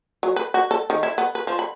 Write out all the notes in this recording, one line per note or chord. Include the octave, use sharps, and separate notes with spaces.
F#3
B4
F#4
A4
D#3
E4
B3
B4
F3
B5